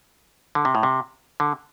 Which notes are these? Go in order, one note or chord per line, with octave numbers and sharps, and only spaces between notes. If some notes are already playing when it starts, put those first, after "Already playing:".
D3
C3
A2
C3
D3